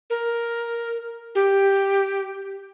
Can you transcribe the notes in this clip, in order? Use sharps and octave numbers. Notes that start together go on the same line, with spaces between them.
A#4
G4